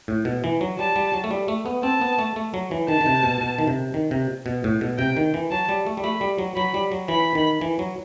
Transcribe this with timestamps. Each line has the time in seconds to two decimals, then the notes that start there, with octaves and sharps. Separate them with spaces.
0.08 A2
0.25 B2
0.44 E3
0.61 F#3
0.79 G3 A5
0.96 G3
1.14 F#3
1.24 A3
1.31 G3
1.48 A3
1.66 B3
1.83 C4 A5
2.01 B3
2.19 A3
2.36 A3
2.54 F#3
2.71 E3
2.88 D#3 A5
3.01 D#3
3.06 C3
3.24 B2
3.41 B2
3.58 D#3
3.67 C3
3.94 D#3
4.11 C3
4.46 B2
4.64 A2
4.81 B2
4.98 C3 G5
5.17 D#3
5.34 E3
5.51 F#3 A5
5.69 G3
5.87 A3
5.97 G3
6.04 A3 B5
6.21 G3
6.38 F#3
6.56 F#3 B5
6.74 G3
6.92 F#3
7.08 E3 B5
7.35 D#3
7.61 E3
7.79 F#3